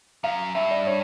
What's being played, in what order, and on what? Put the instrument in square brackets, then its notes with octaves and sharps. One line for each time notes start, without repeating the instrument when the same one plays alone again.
[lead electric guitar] F#2 [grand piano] F5
[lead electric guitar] G2 [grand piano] E5
[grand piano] D5
C#5